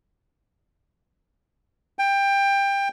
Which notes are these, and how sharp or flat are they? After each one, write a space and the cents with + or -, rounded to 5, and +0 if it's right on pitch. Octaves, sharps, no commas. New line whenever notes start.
G5 +20